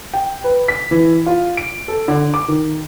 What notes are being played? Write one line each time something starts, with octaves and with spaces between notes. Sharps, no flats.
G5
B4
B6
E3
F4
D7
A4
D3
D6
D#3